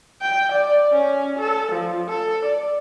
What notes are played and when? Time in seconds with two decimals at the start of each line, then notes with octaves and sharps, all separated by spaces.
0.22 G5
0.52 D5
0.93 C#4
1.39 A4
1.72 F3
2.09 A4
2.45 D5